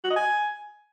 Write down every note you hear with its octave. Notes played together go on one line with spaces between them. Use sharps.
F#4
D#5
G#5